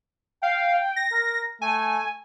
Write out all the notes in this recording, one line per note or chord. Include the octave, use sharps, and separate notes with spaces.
F5 G5
A#6
A#4
A3 G#5